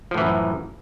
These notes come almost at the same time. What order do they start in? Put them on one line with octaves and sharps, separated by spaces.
F3 A2 E3 F#2